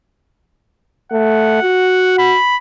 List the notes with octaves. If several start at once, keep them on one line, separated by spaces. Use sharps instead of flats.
A3 F#5
F#4
B5